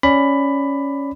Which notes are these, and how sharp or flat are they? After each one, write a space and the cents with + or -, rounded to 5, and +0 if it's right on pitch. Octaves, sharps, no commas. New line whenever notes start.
C#4 +0 D5 +0 B5 +10